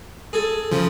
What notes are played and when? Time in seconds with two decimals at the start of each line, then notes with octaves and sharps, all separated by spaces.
0.33 G#4 A4
0.71 C#3 F3